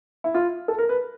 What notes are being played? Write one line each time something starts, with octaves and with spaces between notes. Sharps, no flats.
E4
F4
A4
A#4
B4